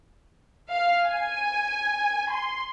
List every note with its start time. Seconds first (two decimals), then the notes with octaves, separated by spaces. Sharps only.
0.68 F5
1.04 G#5
2.31 C6